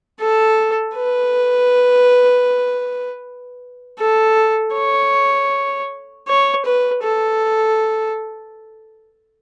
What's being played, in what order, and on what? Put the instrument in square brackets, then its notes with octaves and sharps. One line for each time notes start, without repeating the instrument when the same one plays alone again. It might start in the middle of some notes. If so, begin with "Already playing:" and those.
[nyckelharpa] A4
B4
A4
C#5
C#5
B4
A4